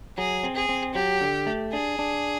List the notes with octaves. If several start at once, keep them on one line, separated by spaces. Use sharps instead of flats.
F#3 G#4
C4
G#4
C4
F#3 G4
D3
A3
D4 G#4
D4